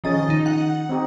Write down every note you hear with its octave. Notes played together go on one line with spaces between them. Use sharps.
D#3 F3 C#4 G#4 D#5 A6
D#3 D#4
F#5
C4 D#4 G4